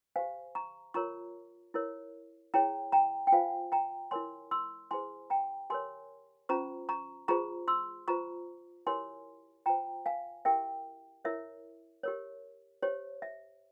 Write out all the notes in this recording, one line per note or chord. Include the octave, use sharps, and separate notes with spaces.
G4 C5 F5 G#5
A#5 C#6
F4 A#4 C#5 A#5 C#6
E4 A#4 C#5
E4 G#4 C#5 G5 A#5
G5 A#5
G5
F4 C5 F5 G#5
G5 A#5
E4 A#4 C#5 G#5 C6
C6 E6
E4 G#4 C5 G#5 C6
G5 A#5
G4 A#4 C#5 G#5 C6
C#4 F4 C5 A#5 C#6
A#5 C#6
F4 G#4 C5 A#5 C#6
C6 E6
F4 C5 A#5 C#6
E4 G4 A#4 C#5 G#5 C6
F4 C5 G5 A#5
F5 G#5
E4 G4 A#4 E5 G5
E4 A#4 C#5 E5
G4 A#4 C#5
G4 C5 C#5
E5